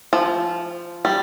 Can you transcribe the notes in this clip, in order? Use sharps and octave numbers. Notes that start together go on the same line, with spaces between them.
F3
G3